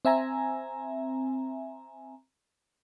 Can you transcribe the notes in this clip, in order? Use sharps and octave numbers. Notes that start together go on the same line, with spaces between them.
C4 E5 G#5 A#5